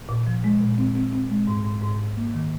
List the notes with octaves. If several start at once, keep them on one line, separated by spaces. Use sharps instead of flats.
A#2
F3
G#3
A#2
C4
C4
C4
G#3
G#2
G#2
G#2
G#2
A#3
D#3